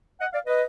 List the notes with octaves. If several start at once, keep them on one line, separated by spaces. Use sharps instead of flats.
D#5 F#5
D5 F5
B4 D#5